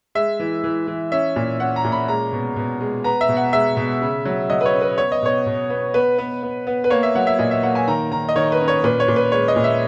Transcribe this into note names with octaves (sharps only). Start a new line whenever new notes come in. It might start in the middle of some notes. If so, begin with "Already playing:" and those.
G#3 E5
E3
E3
E3
C#4 E5
A#2
C#4 F#5
A#5
A#2
B5
G#3 A#5
B2
B2
G#3
B3 A#5
E5
B2
F#5
G#3 E5
B2
C#3
F#3
F#3 D#5
B4
C#5
C#4
B4
B3 C#5
D#5
B2 C#5
B2
B3
B3 B4
B3
B3
B3
B4
A#3 C#5
E5
F#3 F#5
E5
A#2 D#5
E5
A#3 F#5
G#5
D#3 A#5
D#3 A#5
D#5
D#3 C#5
B4
C#4
C#5
A#2 B4
C#5
A#2
B4
G#3 C#5
D#5
A#2
E5